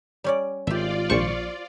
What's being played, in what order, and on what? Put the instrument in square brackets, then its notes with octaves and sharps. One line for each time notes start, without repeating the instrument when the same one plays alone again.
[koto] G3 C#4 D5
[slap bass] G#1 [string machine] F4 D5 [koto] G4 E5
[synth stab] A#1 C#6 [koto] C5